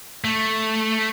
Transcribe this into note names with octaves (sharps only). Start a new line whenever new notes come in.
A3